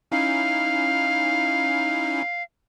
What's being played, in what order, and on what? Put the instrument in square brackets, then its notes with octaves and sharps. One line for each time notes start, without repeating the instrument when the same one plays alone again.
[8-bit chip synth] C#4 D#4 E4 [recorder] F5